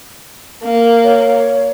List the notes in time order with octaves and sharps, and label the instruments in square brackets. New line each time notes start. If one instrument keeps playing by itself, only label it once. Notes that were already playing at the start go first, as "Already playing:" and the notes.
[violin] A#3
[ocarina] C#5